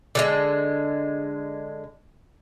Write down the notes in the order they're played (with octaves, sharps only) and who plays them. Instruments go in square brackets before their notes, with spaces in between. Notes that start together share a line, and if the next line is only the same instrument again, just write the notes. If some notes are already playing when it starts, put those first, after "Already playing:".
[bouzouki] D3 F#3 G#3